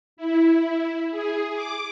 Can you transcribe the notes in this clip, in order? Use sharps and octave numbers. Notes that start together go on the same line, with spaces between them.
E4
G#4
D6